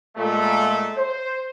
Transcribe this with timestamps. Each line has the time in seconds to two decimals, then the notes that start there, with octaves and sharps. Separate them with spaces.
0.17 A#2 G#3 A3
0.96 C5